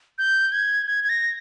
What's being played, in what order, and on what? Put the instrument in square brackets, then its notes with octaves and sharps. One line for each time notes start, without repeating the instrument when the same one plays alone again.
[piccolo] G6
G#6
G#6
G#6
A#6